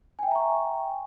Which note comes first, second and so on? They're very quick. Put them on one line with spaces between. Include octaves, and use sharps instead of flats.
G#5 G5 E5 A#5 C#6